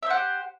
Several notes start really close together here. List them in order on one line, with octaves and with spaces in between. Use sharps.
E5 C5 F#5 G4